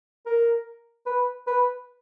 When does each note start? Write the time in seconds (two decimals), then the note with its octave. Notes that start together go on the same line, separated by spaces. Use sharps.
0.26 A#4
1.06 B4
1.47 B4